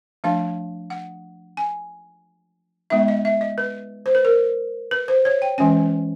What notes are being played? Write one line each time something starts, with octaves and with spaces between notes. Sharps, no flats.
F3 A3 D4 F5
F#5
G#5
G#3 B3 D#4 E5
D#5
E5
D#5
B4
C5
B4
A#4
B4
C5
C#5
G5
E3 G#3 C#4 G#5